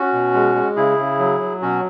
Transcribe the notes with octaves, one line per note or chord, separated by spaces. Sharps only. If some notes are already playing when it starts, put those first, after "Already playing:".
Already playing: C#4 F#4
B2
G#3
G#3
C#3 E4 G#4
C#3
F#3
F#3
B2 C#4 F#4